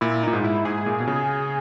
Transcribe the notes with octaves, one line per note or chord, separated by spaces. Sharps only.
A#2 E4
A#2 D#4
G#2
E4
G#2 G#4
A#2
B2
C#3